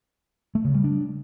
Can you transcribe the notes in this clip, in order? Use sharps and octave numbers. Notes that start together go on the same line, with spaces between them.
A3
C#3
G3
D4